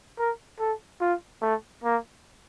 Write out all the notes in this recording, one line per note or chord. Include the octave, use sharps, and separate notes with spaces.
A#4
A4
F4
A3
A#3